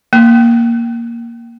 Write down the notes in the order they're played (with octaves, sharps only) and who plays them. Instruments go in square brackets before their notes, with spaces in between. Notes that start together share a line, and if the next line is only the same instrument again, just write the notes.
[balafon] A#3